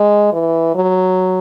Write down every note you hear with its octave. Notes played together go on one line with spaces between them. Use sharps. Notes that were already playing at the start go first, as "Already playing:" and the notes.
Already playing: G#3
E3
F#3